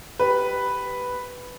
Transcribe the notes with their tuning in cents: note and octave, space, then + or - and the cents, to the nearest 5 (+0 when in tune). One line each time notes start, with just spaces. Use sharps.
G4 -5 B4 +0